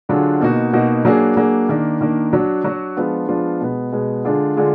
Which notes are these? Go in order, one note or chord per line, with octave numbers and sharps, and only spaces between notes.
D3 F#3 D4 F4 G#4
B2 A#3 D#4 F#4
B2 A#3 D#4 F#4
F#3 A#3 D4 G#4
F#3 A#3 D4 G#4
D#3 A#3 D4
D#3 A#3 D4
F#3 D4 F#4
F#3 D4 F#4
F3 G#3 B3 D4 F4
F3 G#3 B3 D4 F4
B2 G#3 B3
B2 G#3 B3
D3 G#3 D4 F4 G#4
D3 G#3 D4 F4 G#4